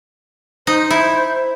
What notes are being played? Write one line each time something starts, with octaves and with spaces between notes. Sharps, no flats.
D#4 C5
E4